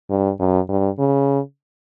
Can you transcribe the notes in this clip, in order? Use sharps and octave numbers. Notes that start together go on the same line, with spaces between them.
G2
F#2
G2
C#3